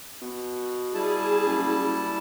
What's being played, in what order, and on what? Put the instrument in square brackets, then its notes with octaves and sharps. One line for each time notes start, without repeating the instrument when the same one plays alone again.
[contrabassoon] B2
[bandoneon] G3 E4 A5 [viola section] G#4
[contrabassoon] F#1